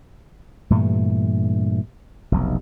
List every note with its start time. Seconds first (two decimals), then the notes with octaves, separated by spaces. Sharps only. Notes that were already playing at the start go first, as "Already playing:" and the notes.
0.70 G2 A#2 E3 A3
2.32 F1 B1